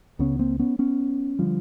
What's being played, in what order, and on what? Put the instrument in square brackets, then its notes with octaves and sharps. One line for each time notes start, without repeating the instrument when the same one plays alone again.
[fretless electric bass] C#2 C#3 B3 C#4
A#3 C4
B3 C#4
B3 C#4
D3 F3 G3